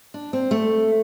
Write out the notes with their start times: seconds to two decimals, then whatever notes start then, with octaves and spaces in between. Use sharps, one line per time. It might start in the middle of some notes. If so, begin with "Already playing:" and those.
0.14 D4
0.33 C4
0.51 A3